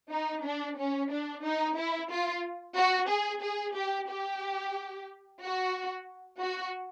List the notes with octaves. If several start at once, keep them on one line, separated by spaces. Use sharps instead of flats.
D#4
D4
C#4
D4
D#4
E4
F4
F#4
G#4
G#4
G4
G4
F#4
F#4